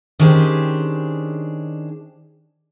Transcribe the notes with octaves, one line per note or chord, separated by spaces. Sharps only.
D#3 C#4 D4 G4 G#4 C5